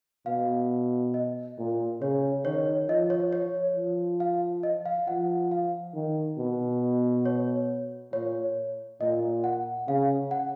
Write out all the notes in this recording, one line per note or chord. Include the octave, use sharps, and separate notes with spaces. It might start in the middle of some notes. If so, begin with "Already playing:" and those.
B2 F5
D#5
A#2
C#3 C#5
D#3 C#5
F3 D#5
C#5
C#5
F3
F5
D#5
F5
F3 F#5
F5
D#3
B2
C#5
A#2 C#5
A#2 D#5
F#5
C#3 F5
F#5